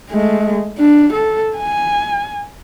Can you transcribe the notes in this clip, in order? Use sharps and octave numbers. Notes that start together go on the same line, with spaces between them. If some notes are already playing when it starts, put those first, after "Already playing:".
G#3 A3
D4
A4
G#5